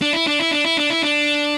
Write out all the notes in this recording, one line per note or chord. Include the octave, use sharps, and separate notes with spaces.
D4
E4
D4
E4
D4
E4
D4
E4
D4